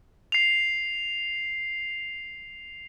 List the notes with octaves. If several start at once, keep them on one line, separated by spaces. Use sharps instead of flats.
C7 F7